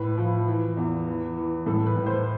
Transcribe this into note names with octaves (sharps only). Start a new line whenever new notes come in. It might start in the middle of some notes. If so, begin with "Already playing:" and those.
Already playing: A2 B4
F3
E3
E2
E3
E3
A2 A4
B4
A2
C5